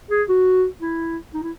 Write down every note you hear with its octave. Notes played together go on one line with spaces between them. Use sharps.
G#4
F#4
E4
D#4
E4